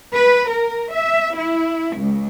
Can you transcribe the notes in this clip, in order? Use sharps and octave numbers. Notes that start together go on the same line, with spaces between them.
B4
A#4
E5
E4
C#2